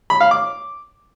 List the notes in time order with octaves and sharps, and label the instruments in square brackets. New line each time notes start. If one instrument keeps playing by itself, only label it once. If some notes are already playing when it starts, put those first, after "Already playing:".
[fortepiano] B5
F5
D6